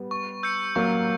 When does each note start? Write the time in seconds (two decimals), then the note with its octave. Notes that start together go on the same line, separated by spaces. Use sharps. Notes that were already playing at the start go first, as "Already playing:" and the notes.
Already playing: G3 B3
0.11 C#6
0.43 E6 G6 C#7
0.75 F#3 A#3 C#6